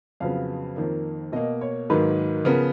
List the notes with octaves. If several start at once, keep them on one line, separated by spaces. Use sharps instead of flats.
F2 C#3 F#3 B3 F5
F2 D#3 A#3
B2 A#3 D#5
C#5
G#2 D#3 F#3 A#3 B4
C#3 F3 B3 A#4